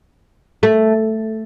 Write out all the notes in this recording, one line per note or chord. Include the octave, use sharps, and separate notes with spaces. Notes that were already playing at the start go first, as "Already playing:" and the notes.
A3